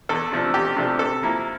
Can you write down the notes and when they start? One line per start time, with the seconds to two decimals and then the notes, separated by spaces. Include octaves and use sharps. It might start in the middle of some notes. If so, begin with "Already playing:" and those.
0.09 E2 A4
0.32 C3 F3 A3 D4
0.54 E2 G4
0.76 C3 F3 A3 D4
0.99 C3 A4
1.22 F3 A#3 E4